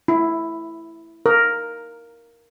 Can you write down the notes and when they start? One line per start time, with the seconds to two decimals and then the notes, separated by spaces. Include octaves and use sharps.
0.08 E4
1.26 A#4